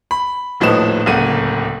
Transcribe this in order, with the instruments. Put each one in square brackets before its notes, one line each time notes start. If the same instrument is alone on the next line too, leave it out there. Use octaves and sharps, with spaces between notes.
[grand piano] B5
D#1 A2 F3 D#4 B4 E7
D1 C#2 A#3 F#5 D#7